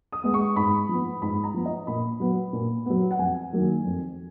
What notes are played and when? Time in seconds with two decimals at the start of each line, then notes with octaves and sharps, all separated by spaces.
0.12 D#6
0.23 G#3 B3
0.34 C#6
0.56 G#2 B5
0.89 F3 B3
1.22 G#2 B5
1.44 A#5
1.54 F3 B3
1.65 D#5
1.87 A#2 B5
2.20 F#3 B3
2.53 A#2
2.86 F#3 B3
3.11 F#5
3.19 F2 G#5
3.53 D#3 F#3 A#3
3.85 F2